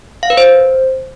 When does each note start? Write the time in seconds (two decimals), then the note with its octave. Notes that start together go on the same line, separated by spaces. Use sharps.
0.23 F5
0.30 B4
0.37 C5